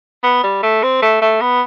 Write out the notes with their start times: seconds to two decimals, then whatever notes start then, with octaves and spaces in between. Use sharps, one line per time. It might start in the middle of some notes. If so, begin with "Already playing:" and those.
0.24 B3
0.43 G3
0.63 A3
0.83 C4
1.02 A3
1.21 A3
1.41 B3